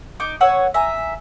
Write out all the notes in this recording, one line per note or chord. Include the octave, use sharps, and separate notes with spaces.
D#4 D6
B4 C#5 F#5 E6
E5 G#5 A#5